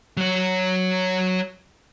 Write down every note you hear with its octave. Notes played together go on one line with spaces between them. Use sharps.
F#3 C#5